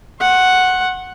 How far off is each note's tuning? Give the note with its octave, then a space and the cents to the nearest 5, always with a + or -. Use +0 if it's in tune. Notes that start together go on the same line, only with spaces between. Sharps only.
F#5 +0 C6 +40